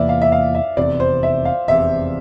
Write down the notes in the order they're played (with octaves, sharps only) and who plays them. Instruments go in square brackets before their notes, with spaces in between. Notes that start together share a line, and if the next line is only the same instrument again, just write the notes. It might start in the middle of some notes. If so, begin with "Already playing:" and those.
Already playing: [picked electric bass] E2 C3 E3 A#3 [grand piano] D5 E5
[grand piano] F5
E5
F5
E5
[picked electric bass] F1 E2 C3 [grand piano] D5
[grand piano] C5
E5
F5
[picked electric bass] F1 E2 C3 [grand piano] E5